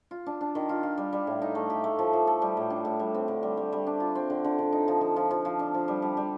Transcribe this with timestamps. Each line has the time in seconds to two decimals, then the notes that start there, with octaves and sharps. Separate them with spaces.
0.11 F4
0.26 D4
0.41 D4
0.55 D#3
0.69 F4
0.83 F4
0.98 G3
1.13 G3
1.27 A2
1.42 D#4
1.55 A3
1.70 G4
1.84 A3
1.99 F3
2.13 F3
2.27 A4
2.42 G3
2.57 A2
2.70 D4
2.85 A2
3.00 G3
3.14 C4
3.28 D3
3.43 G3
3.57 G3
3.72 G3
3.87 D4
4.00 F4
4.15 C4
4.30 D3
4.44 D3
4.59 D3
4.73 D#4
4.88 F3
5.01 F3
5.16 F3
5.31 F3
5.45 F3
5.59 D4
5.74 F3
5.88 G3
6.02 G3
6.17 G3